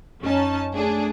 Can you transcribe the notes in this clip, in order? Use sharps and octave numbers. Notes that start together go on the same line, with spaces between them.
F#2 C#4 D#4 A5
A3 D4 G#4